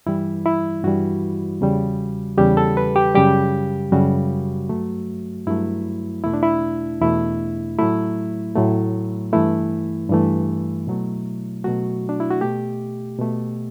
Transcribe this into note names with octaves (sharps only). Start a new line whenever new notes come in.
G2 E3 G3 E4
E4
G2 E3 G3 F#4
E2 C#3 G3
E2 C#3 G3 G4
A4
B4
G4
F#2 C#3 G3 G4
F#2 C#3 G3 F#4
G2 F#3 A3
G2 F#3 A3 E4
E2 B2 A3 E4
D4
E4
E2 B2 A3 E4
A2 F#3 A3 E4
A2 F#3 A3
G2 E3 A3 E4
G2 E3 A3
B2 F#3 A3
B2 F#3 A3 F#4
D4
E4
F#4
B2 A3 G4
B2 A3